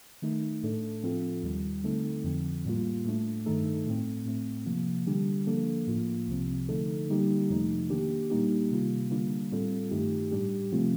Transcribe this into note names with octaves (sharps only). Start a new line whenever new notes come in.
D#3 A3 D#4
A2 A3 D4 A4
A2 F3 C4 F4 A4
D#2 D#3 G3
D3 A3 C4 D#4 A4
F2 D3 F3 C4
A2 G3 A#3 F4
A2 A3 D4
G2 D#3 A3 D#4 A4
A2 A3 C4
A2 A3 C4
C3 F3 A#3
D3 G3 D4 G4
D3 F3 A#3 D4 A4
A2 F3 A#3 F4
C2 C3 F3 C4
D3 F3 A3 D#4 A4
D3 G3 A#3 D#4 G4
F2 C3 F3 A3 D#4
D#3 A#3 D4 G4
A#2 G3 A#3 D#4 G4
C3 D#3 G3 A#3 F4
D3 G3 A#3 D4 F4
A2 G3 C4 F4 A4
G2 D#3 A3 D#4 G4
A2 G3 D4 G4
C3 F3 A3 C4 F4